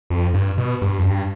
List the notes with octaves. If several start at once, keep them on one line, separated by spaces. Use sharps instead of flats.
F2
G2
B2
G2
F2
G2